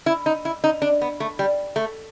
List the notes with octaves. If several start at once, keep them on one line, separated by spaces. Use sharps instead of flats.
E4
D#4
E4
D#4
D4
B3
A3
G3
A3